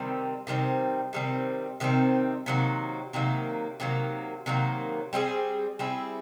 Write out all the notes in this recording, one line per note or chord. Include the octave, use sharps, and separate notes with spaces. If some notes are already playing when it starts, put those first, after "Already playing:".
Already playing: C3 D#3 G3 C4
C3 D#3 G3 C4
C3 D#3 G3 C4
C3 D#3 G3 C4
C3 D#3 F#3 A#3
C3 D#3 F#3 A#3
C3 D#3 F#3 A#3
C3 D#3 F#3 A#3
G3 C4 E4 G#4
G3 C4 E4 G#4